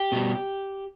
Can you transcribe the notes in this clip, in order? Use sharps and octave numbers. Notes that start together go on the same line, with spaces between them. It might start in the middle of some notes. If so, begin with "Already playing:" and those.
Already playing: G4
B2 G3